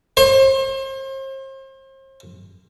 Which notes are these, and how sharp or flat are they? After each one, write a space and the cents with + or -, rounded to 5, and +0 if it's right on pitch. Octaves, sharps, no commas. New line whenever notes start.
C5 +40